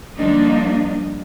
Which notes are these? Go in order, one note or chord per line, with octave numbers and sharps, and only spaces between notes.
D3 F3 G3 A#3 D4 D#4